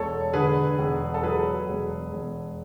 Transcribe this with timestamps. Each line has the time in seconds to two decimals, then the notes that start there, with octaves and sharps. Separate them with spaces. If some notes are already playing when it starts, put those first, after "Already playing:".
Already playing: E1 A4 C#5
0.33 D3 G#4 B4
0.78 E1
1.14 A4
1.23 F#3 G#4 B4
1.68 E1
2.13 E1